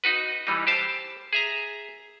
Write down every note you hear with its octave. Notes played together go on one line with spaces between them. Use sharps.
D#4 F#4 B4
E3 G3 D#4
G4 C5 A5
G#4 E5 A#5